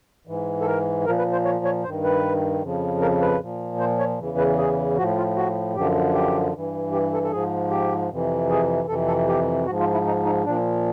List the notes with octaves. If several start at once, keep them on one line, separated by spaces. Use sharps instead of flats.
G#2 E3
A4
A#4
A#2 F3 A#4
B4
C5
C#5
C#5
G2 D#3 C5
B4
F2 C#3 F3
A#4
B4
A#2 F3
C5
C#5
E2 C#3 E3
B4
G#4
A2 F3 F#4
F4
F#4
F#2 D3 F3 G4
G4
G2 E3
G4
A4
A4
G#2 F3 G#4
G4
F2 C3 E3
G#4
F2 C3 E3 A4
A4
G4
G#2 F3 F#4
F4
E4
D#4
D#4
A#2 F3 D4